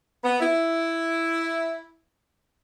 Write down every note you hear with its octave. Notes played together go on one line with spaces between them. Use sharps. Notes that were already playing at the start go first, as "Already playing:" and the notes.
B3
E4